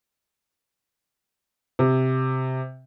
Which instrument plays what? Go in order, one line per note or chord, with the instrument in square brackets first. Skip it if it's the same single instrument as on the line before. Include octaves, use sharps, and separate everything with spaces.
[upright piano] C3